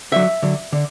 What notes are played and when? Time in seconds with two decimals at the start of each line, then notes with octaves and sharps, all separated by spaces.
0.12 D3 F#3 E5
0.43 D3 F#3
0.72 D3